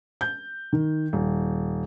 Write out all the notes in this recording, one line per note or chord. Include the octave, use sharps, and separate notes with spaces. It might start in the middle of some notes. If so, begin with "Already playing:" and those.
G6
D#3
D#1